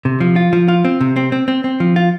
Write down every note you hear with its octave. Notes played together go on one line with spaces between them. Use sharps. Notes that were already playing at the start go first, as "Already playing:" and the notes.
C3
F3
F4
F3
F4
C4
C3
C4
C4
C4
C4
F3
F4